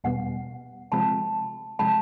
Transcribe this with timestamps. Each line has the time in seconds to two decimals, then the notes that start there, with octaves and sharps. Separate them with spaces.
0.04 E2 B2 G3 B3 F#5 G#5
0.92 C3 F3 G#3 C4 F4 A5 B5
1.79 C3 F3 G#3 A5 B5